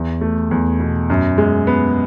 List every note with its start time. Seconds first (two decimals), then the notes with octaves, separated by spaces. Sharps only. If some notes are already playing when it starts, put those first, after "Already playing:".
Already playing: E2
0.21 A3
0.51 E2
0.80 B2
1.10 F#2
1.38 G#3
1.67 B3